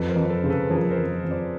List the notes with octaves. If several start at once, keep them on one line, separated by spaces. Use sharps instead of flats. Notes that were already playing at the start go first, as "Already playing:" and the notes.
Already playing: F2 A4 B4
A#4 C5
F2
A4 B4
C#3 C5
A4 B4
F3 G#4 A#4
A#4 C5
F2
F2
C5 D5